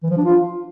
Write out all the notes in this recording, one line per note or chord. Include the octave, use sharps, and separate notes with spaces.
E3
F3
D4
F4